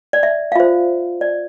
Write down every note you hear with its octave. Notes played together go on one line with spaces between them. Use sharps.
D5
E5
F5
F4 C5 E5
D5